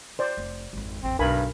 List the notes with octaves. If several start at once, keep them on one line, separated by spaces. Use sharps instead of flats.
C5 D5
F1
G#1 F2
A1 F2 C4
B1 G2 A#4 G#5 B5